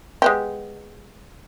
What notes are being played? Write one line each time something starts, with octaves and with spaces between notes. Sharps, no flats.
G#3 B3 G4